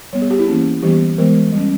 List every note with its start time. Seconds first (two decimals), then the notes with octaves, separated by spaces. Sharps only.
0.13 G3 B3 C#5
0.22 G#4
0.30 G4
0.39 E4
0.48 E3 A#3 C#4
0.82 E3 G3 B3 G4
1.18 E3 G#3 B3 A#4
1.52 G3 C#4